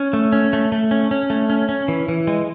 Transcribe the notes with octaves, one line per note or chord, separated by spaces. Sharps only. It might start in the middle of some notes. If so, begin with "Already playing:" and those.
Already playing: C#4
A3
C#4
A3
A3
C#4
C#4
A3
C#4
C#4
E3
E3
G#3